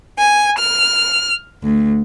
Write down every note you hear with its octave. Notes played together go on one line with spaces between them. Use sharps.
G#5
F6
D2